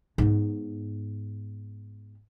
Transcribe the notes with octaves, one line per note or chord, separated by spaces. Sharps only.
G#2 B3